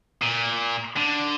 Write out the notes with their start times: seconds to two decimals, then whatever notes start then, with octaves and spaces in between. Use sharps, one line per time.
0.22 A#2
0.97 D3